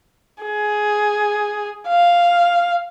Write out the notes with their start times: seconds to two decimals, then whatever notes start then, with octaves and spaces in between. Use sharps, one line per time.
0.44 G#4
1.88 F5